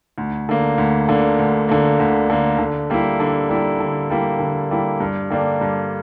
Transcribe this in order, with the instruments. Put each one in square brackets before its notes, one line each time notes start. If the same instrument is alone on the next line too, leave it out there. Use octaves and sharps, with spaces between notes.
[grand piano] D2
D3 A#3
D2
D3 A#3
D2
D3 A#3
D2
D3 A#3
D3
G3 A#3 E4
D3
G3 A#3 E4
D3
G3 A#3 E4
D3
G3 A#3 E4
G2
D3 G3 A#3 D4
G2